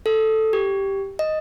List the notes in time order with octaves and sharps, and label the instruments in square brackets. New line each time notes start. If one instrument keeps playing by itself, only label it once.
[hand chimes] A4
G4
D#5